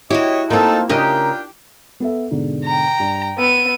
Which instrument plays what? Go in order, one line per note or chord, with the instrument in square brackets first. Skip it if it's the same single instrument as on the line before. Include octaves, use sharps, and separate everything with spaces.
[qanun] E4 F#4 [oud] G4 [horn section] C#5 D#5
[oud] A#3 C4 [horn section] D#4 A4 [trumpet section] F4 A5
[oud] C#3 A#4 D#5 [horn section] D4 F4 G5 [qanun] G4 [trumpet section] A#5
[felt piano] B3 A4 E5
G#2 B2 D3
[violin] G5 A#5
[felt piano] G2
[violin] B3 D#7 [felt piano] E6